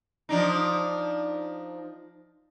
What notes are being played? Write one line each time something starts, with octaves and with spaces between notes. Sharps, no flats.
F3 D4 D#4